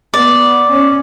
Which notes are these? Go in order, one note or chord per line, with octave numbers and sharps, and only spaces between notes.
B3 D5
C#4